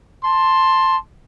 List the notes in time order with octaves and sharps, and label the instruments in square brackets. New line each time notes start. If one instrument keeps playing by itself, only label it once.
[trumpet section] A5 C6